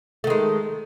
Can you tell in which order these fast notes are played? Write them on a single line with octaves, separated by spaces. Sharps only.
A3 D#3 G#3